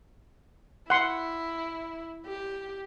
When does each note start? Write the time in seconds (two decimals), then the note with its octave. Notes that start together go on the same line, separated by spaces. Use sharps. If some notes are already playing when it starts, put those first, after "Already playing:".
0.90 E4 F#5 C6
2.27 G4